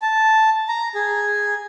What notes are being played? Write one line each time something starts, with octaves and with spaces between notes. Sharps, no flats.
A5
A#5
G#4